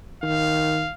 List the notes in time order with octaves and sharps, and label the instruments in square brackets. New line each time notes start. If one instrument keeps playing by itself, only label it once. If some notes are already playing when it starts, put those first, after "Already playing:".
[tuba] D#3 [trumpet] F5